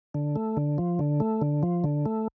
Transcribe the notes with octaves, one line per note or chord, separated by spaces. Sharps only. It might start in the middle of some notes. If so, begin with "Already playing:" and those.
D3
A3
D3
F3
D3
A3
D3
F3
D3
A3